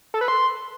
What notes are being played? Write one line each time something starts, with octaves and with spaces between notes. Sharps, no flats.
A4
B4
C6